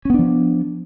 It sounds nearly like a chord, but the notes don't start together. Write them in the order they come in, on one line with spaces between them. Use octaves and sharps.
C#4 B3 D4 F3